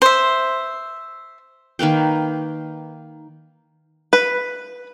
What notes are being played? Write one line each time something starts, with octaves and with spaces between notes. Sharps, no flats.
C5 E5
D#3 A#3 B4 G5
B4